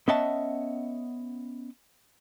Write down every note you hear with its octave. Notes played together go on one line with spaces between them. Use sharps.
B3 C#4 D#5 E5 F#5 A5